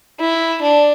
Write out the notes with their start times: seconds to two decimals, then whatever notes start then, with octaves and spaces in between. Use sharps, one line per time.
0.20 E4
0.62 D4